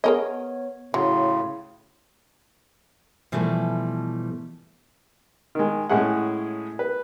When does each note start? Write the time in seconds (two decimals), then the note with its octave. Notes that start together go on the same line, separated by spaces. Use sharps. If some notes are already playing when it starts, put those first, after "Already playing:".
0.04 B3 G#4 A#4 C#5 D#5
0.94 A2 C#3 F#3 C6
3.32 B2 E3 F3 G3 A3
5.55 D#3 G#3
5.89 A2 G#3 C#4 E4 G#4 F#5
6.79 B4